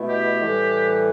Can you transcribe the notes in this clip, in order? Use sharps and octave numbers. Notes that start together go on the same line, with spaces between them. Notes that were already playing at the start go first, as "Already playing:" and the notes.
Already playing: B2 A3 E4
G4
A2 E3 G3